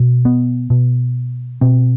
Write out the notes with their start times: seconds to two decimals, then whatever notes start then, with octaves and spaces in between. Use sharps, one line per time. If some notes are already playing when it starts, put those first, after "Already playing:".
Already playing: B2
0.25 B3
0.70 B2
1.61 B2 C4